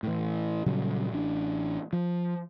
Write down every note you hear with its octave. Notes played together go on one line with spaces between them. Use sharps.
A2 E3
A#2 C#3 F#3 G3
A1 D4
F3